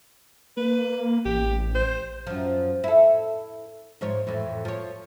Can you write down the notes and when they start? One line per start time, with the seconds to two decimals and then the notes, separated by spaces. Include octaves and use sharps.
0.57 A#3 B4
1.25 A1 G4
1.75 C5
2.27 F#2 F3
2.84 E4 A4
4.01 G#2 F3 C#5
4.27 F2 A2 E3
4.65 F3 C#5